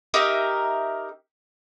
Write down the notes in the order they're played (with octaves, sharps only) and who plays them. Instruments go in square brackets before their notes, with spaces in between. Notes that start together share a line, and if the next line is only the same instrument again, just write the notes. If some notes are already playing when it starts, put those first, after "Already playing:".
[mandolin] D#4 G4 A#4 E5